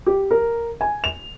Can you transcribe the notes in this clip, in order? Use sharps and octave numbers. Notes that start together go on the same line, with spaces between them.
G4
A#4
G#5
F7